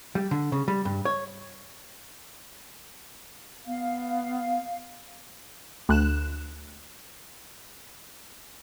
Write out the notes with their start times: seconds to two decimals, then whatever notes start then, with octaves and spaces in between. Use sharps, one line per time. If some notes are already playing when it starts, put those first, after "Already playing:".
0.15 G3
0.31 D3
0.52 C#3
0.68 G3
0.85 G2
1.05 C#5
3.66 B3 F5
5.89 D2 F#6 E7